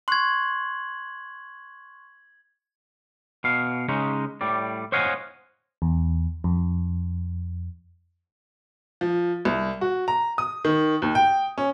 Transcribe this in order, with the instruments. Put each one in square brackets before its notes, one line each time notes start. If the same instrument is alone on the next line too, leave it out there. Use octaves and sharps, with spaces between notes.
[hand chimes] C6 C#6 F#6 [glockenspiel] G#6 F#7
[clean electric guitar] B2 F5
C#3 G#3 C#4 D#4
A2 G3 D5
C5 C#5 D#5 F5 F#5 G#5
[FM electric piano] E2
F2
[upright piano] F3
C2
F#4
A#5
D#6
D#3
D#2
G5
C#4